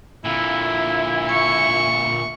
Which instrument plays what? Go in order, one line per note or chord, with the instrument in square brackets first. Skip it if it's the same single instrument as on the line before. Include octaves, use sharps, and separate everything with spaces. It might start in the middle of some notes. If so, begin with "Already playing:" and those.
[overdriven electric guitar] A#2 D3 [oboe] E4 [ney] E5
[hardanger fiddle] C#6